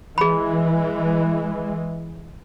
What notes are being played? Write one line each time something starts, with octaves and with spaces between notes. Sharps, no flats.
E3 G#3 G#4 B5